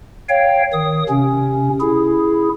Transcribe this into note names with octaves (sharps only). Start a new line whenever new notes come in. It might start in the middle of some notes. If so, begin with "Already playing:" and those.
C#5 F5 G5
D#3 D#6
C3 C#4
E4 G#4